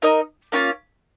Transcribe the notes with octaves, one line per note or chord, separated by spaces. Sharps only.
D#4 A#4 D#5
A#3 C#4 F4